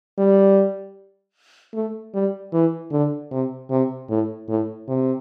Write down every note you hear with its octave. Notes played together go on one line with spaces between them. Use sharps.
G3
A3
G3
E3
D3
C3
C3
A2
A2
C3